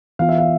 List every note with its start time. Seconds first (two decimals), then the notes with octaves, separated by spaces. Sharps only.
0.19 E3 B3 F4 F5
0.29 E5
0.38 F5